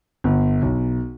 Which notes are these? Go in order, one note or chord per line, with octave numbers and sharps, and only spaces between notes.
G1
B1